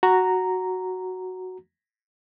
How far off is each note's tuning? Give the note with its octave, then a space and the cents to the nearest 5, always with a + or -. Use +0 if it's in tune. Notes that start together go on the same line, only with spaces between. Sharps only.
F#4 +0 A#5 -5